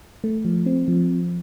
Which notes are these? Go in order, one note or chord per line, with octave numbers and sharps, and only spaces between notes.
A3
F3
C4
F3